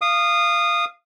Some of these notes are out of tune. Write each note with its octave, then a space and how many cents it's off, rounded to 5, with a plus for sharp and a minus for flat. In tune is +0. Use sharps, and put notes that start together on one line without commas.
F5 -15 D#6 -20